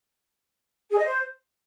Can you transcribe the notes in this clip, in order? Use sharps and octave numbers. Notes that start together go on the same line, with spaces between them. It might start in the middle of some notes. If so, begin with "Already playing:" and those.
G#4
D#5
C5